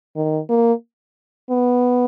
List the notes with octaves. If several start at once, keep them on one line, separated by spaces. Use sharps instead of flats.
D#3
A#3
B3